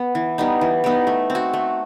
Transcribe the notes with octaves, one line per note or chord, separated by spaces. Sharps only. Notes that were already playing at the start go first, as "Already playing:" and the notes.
Already playing: B3
E3
G3 B3 D#4
E3
G3 B3 D#4
A3
C4
F#4
A3